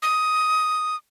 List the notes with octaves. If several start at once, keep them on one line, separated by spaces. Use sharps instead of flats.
D#6